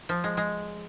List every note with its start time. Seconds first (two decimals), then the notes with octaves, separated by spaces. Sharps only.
0.09 F3
0.24 G#3
0.37 G#3